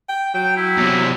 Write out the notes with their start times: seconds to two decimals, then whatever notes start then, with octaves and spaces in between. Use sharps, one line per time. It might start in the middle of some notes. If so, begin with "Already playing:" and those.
0.09 G5
0.34 F#3 G5
0.57 E4
0.77 E2 C3